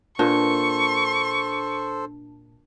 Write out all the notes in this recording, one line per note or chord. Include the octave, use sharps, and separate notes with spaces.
A#2 D4 A4 C5 A5 C#6